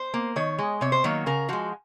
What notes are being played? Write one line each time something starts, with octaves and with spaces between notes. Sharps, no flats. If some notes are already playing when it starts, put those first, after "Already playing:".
Already playing: C5
A#3
D#3 C#5
G#3
C3 C#5
C5
D#3 F#3 A#3 C#5
C#3 A#4
F3 G#3 F#4